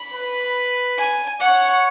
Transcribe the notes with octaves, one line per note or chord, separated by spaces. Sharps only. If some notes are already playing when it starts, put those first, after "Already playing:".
Already playing: B5
B4
G#5
C#5 F#5